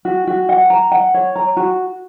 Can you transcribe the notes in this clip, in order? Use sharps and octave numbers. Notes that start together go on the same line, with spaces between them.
F#4
F#4
F#5
A#5
F#5
C#5
A#5
F#4